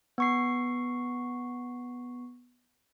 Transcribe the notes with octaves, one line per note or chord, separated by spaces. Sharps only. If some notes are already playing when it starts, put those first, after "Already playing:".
B3 C#6 C7